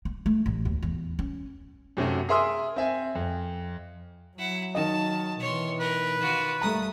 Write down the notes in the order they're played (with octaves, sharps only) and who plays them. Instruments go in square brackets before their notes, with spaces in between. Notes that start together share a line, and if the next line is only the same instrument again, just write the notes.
[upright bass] A#3
A3
A1
D#2
E2
C#4
[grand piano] F#2 C3 A3 C#4 F#4
G#4 A#4 E5 C6 D#6 E6
C4 E5 G#5
F2
[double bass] F#3 [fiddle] E4 F#5
[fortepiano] D#3 D#5 [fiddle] A5
[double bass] B2 E3 [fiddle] C#5 C6
[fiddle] A#4 [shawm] B4
[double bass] D#3 [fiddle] F4 F#4
[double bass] G3 A3 [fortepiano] A#5 [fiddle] D#6